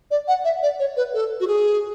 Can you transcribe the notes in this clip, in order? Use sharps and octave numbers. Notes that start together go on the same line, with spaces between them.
D5
F#5
E5
D5
C#5
B4
A4
F#4
G#4